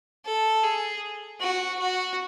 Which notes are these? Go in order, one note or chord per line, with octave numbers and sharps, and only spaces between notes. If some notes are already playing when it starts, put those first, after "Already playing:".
A4
G#4
F#4
F#4